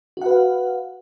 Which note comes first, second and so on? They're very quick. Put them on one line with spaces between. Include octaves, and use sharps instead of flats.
F#4 F#5 B4 F5